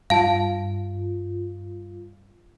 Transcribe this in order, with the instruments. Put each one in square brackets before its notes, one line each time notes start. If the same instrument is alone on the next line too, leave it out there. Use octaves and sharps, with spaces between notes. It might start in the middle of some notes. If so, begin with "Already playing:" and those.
[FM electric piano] G2 F4 [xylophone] F5 A5